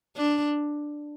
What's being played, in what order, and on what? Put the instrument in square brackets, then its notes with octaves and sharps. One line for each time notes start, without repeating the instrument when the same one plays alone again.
[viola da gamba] D4